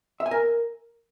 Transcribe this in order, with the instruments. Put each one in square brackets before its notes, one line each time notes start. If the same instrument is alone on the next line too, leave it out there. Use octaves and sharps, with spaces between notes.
[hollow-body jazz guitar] E5
G#5
A#4